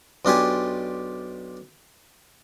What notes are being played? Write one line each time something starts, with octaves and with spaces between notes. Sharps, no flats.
B1 D4 F4 G4 G#5